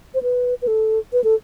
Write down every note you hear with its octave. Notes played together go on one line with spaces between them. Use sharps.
C5
B4
B4
A4
B4
A4